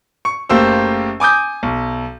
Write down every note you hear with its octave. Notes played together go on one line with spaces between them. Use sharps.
C#6
F#1 A3 A#3 G4 C5 E6
G#5 D6 D#6 G6
B1